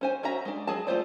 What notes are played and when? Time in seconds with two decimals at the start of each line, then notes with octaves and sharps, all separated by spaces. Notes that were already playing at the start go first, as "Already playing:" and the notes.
0.01 C#4 C5 G#5
0.23 C#4 F#4 E5 A#5
0.45 G#3 D4
0.67 F#3 G#4 A5
0.87 A3 F4 C5 D5